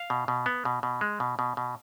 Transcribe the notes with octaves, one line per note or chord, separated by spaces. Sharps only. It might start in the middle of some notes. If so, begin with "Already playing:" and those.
Already playing: F5
B2
B2
B3
B2
B2
G#3
B2
B2
B2